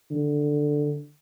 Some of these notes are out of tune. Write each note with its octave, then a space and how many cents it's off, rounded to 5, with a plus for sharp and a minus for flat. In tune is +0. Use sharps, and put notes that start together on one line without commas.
D3 +5